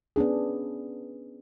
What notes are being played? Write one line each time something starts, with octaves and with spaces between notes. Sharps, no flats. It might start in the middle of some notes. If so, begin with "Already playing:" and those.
B3 C#4 D4 G#4